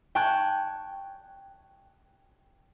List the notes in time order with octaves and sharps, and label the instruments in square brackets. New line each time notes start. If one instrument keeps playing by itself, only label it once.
[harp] G5 A5 C#6 F#6 G#6